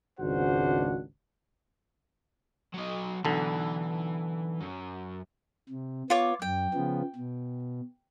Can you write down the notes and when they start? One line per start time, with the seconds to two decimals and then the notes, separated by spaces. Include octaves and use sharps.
0.20 G#1 C#2 D4 F#4 C5 F#5
2.74 F#3 D#5
3.25 B1 D3 E3
4.61 F#2
5.69 C3
6.10 B3 F4 C#5 D6
6.42 F#2 G5
6.74 C#3 F3 B3
7.16 B2